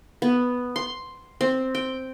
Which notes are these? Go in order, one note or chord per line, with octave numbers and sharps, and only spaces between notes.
B3
C6
C4
G5